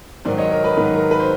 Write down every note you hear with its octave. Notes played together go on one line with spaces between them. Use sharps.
G#2 D#3 F#3 C5 D5
C#5 D#5
A#4
B4
G#2 D#3 F#3 B4
A#4
B4
C5